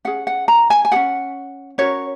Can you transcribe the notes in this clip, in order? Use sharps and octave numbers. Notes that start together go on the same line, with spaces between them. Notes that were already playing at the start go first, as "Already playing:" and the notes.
C#4 G#4 F#5
F#5
A#5
G#5
G#5
C#4 G#4 F#5
C#4 F#4 A#4 C#5